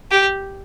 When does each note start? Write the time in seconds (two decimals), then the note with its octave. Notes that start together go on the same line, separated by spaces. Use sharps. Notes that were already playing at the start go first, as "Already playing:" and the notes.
0.12 G4